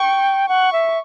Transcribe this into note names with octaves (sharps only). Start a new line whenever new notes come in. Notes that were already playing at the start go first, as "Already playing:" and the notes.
Already playing: G5 C#6
F#5 C#6
E5